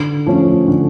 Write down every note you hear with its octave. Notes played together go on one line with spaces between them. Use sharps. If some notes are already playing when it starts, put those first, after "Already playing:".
Already playing: D3
F3 A3 C#4
D3